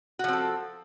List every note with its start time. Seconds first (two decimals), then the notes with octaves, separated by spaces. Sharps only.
0.19 F#4
0.24 F3
0.28 C4
0.33 A4